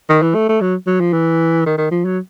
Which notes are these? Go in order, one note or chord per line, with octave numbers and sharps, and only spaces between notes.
D#3
E3
A3
A3
F#3
F#3
F3
E3
D#3
D#3
F3
F#3